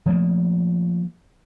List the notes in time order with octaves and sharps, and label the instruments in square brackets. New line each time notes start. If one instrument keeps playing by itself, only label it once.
[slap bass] F3 A3 A#3